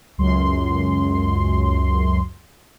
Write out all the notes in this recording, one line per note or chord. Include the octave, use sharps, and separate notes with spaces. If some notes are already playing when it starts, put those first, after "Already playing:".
C#2 F#2 C6